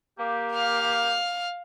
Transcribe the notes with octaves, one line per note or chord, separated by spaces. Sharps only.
A#3 G4
F5 F6